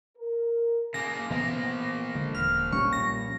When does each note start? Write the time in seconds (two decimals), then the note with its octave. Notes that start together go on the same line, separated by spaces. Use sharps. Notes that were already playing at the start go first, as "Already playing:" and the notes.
0.18 A#4
0.94 C#3 A#3 A#6
1.30 B2 E3 F3 A#3 F5
2.15 D3 G#3
2.35 D#1 F6
2.73 B1 A#2 G3 C#4 C#6
2.93 A#6